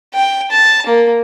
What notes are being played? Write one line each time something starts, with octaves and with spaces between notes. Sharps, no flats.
G5
A5
A#3